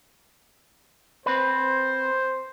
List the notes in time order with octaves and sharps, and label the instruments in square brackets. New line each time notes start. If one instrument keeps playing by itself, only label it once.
[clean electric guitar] C4 B4 [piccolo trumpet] C5